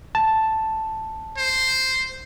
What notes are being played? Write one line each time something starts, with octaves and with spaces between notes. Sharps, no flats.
A5
C5